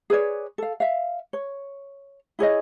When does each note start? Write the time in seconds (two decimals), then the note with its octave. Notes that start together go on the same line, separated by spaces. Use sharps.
0.10 G#4 B4 C#5 D5
0.58 A4 F5
0.80 E5 F5
1.33 C#5
2.39 E4 G#4 C#5 D#5